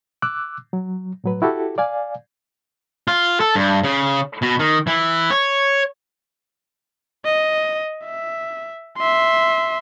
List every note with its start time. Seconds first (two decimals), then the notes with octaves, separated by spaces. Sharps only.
0.22 D6 E6 F#6
0.73 F#3
1.24 A2 F#3 B4
1.42 E4 F#4 G4 A4
1.78 D5 F5 G#5
3.08 F4
3.40 A4
3.55 G2
3.84 C#3
4.42 B2
4.59 D#3
4.87 E3
5.31 C#5
7.25 D#5
8.04 E5
8.98 E5 C6